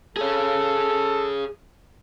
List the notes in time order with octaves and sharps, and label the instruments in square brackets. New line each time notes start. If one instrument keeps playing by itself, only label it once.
[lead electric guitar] G#4 C#5 [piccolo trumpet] A4